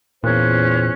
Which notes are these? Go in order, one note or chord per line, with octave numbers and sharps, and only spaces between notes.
E2 A#2 C#4 C5 F#6